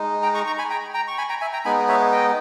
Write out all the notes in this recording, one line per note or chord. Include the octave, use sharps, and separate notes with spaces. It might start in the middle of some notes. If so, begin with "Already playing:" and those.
Already playing: G#3 D#4
G5 A#5
A#5 C#6
A#5 C#6
G#5 B5
G5 A#5
G5 A#5
C#6
G#5 B5
G5 A#5
E5 G#5
G5 A#5
G#3 B3 D#4 G#5 B5
C#5 E5
D#5 G5